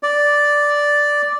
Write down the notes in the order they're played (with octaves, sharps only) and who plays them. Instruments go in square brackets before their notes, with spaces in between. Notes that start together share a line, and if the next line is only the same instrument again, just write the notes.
[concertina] D5